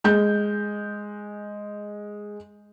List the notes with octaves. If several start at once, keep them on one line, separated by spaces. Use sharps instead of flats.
G#3 G6